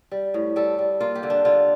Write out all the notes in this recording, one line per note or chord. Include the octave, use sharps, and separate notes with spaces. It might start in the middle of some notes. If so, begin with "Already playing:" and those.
G3
A2
G3 A4
G3
A#3 F4
G4
D3
D4
D3 F4